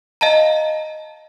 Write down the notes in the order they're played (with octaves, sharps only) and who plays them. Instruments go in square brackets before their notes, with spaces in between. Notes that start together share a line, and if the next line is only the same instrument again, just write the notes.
[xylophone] D#5 F5 A5 A#5